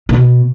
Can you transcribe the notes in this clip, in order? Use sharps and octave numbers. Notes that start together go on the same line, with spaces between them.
B2